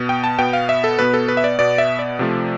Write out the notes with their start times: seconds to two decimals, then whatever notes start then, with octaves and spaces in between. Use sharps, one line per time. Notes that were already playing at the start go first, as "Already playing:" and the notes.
Already playing: B2 B3
0.09 G5
0.24 A5
0.39 B2 B3 G5
0.53 F5
0.69 E5
0.84 A4
0.99 B2 B3 B4
1.14 A4
1.28 B4
1.37 E5
1.44 D5
1.59 B2 B3 D5
1.78 E5
1.99 D5
2.19 C3 F3 A3